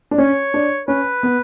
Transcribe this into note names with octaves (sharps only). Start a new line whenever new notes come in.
D4
C#4 C#5
D4
C#4 B4
B3